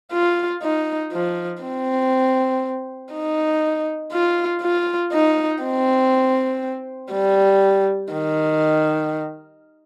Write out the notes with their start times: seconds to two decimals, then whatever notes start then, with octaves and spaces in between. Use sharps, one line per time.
0.12 F4
0.63 D#4
1.12 F3
1.62 C4
3.13 D#4
4.13 F4
4.62 F4
5.13 D#4
5.63 C4
7.13 G3
8.13 D#3